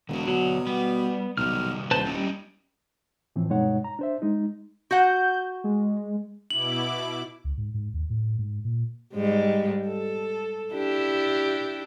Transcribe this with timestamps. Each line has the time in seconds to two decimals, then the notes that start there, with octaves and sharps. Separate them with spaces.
0.09 E1 D3 F#4
0.28 B2 F#3
0.67 G3 B3
1.38 B1 C3 D#3 G3 F6
1.91 D#1 B4 C5 A5
2.05 G3 C#4 D#4 E4
3.36 A2 E3 F3 C4
3.49 G2 B2 G#3 D#4 C#5 F#5
3.84 A#5
3.99 D4 C5 E5
4.22 G#3 D#4
4.91 F#4 F#5 G6
5.64 G#3
6.50 B2 E4 D6 F#7
7.44 C#2
7.57 G#2
7.74 G#2
7.93 D#2
8.10 A2
8.38 G#2
8.64 A#2
9.14 G#2 G3 G#3
9.88 A4
10.74 D4 E4 G4